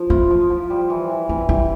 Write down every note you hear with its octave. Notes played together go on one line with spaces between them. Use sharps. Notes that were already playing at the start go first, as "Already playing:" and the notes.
Already playing: F3
E4 F4
F3
F3
G3
E3
E3
E3 E4
G3 E4